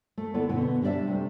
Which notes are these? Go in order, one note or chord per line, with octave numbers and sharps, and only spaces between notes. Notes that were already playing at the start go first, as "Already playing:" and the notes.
A3
D3 B3 E4 A4 B4 D5
B2 D3 B3 C4
G3 D4 B4 D5 E5
C3 G3 A3